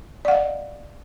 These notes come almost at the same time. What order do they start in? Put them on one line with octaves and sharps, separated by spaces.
D5 F#5 F5 D#5